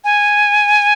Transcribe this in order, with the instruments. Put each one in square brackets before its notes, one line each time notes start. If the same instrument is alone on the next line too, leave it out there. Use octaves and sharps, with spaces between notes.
[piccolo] G#5